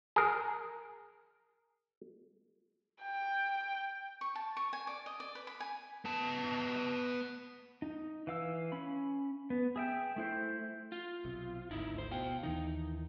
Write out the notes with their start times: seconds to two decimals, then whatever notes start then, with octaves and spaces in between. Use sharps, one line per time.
0.16 G#4 A#4
3.02 G5
4.21 C#6
4.35 A5
4.57 C#6
4.73 G#5
4.87 D5
5.06 D#5
5.20 D5
5.35 B4
5.47 B5
5.60 G#5
6.05 B3 A5
7.82 D#4
8.27 E3 F5 E6
8.72 C#4 B5
9.50 B3
9.76 G#4 E5 G5
10.16 A3 E4 C5
10.92 F4
11.25 B1 C3
11.71 G#1 D2 D#4 E4
11.98 C5
12.11 B2 F5 G5
12.43 D#2 D#3 E3 D#4